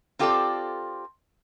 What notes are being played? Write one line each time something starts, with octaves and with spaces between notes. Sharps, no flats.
C4 F4 G4 A4 C5 D5